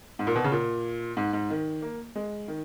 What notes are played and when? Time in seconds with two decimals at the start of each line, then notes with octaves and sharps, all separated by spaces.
0.19 G#2
0.27 A#2
0.36 B2
0.44 C#3
0.52 A#2
1.17 G#2
1.33 G#2
1.50 D#3
1.82 A#3
2.16 G#3
2.48 D#3